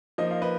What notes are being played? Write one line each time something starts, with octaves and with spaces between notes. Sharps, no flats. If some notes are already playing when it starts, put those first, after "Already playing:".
F3 A#3 D#4 D#5
F5
B4 D#5